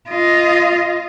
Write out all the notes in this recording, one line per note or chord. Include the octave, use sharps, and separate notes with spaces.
F4 D#5